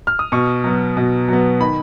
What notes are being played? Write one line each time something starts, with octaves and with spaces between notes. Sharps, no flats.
F6
D#6
B2 C#6
F#3 B3
B2
F#3 B3
D#3 B5